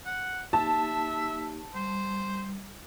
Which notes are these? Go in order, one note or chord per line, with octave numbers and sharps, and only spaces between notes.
F#5
A#3 D#4 G4 E5 A5
G3 C5